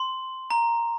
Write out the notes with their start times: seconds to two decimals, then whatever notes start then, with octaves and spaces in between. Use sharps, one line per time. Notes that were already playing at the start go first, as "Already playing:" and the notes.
Already playing: C6
0.50 A#5